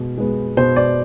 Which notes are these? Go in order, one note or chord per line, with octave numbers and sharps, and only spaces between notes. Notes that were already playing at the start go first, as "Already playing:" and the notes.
Already playing: B2 G#3
G#3 B3
B2 C5
D5